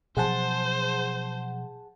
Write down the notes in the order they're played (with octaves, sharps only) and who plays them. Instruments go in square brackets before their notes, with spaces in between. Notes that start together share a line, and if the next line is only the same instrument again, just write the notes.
[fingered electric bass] B2 F3 F#3 [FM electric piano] G#4 F#5 A5 [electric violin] C5